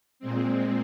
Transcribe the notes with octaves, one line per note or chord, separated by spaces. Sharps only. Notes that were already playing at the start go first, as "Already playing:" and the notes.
A#2 G#3 C4